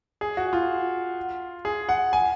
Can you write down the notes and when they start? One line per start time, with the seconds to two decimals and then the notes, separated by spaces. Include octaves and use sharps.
0.21 G#4
0.37 F#4
0.53 F4
1.65 G#4
1.89 F#5
2.13 G#5